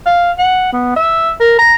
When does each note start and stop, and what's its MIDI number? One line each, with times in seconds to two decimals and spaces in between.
0.06 0.32 77
0.39 0.68 78
0.73 0.95 59
0.96 1.32 76
1.41 1.56 70
1.59 1.75 82